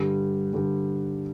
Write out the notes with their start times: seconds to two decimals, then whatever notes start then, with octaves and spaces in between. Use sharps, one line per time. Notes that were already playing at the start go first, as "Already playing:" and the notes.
Already playing: G2 D3 G3
0.53 G2 D3 G3